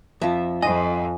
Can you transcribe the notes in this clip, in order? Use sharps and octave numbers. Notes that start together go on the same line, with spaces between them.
F2 F3 E5
F2 D#5 G#5